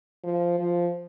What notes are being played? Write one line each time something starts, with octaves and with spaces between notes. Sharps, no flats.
F3
F3